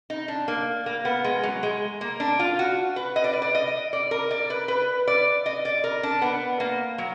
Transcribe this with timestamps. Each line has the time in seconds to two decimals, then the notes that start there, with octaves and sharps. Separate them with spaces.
0.10 D#4
0.28 D4
0.48 A#3
0.86 A#3
1.05 B3
1.24 G#3
1.43 F#3
1.63 G#3
2.01 A#3
2.20 D4
2.39 F4
2.59 F#4
2.96 B4
3.16 D#5
3.24 D5
3.33 B4
3.42 D5
3.55 D#5
3.93 D5
4.11 A#4
4.31 D5
4.50 B4
4.68 B4
5.07 D5
5.46 D#5
5.65 D5
5.84 A#4
6.03 D4
6.22 B3
6.60 A#3
6.98 F#3